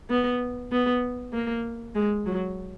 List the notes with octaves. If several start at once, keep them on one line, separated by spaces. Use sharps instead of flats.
B3
B3
A#3
G#3
F#3